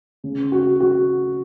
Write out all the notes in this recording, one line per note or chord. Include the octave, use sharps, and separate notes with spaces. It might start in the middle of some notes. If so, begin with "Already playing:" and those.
C#3
F#4
F#4